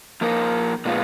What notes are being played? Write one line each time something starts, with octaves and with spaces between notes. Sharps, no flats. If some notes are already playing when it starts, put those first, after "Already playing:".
F3 A#3 D#4 A#4
A#2 G#3 B3 F4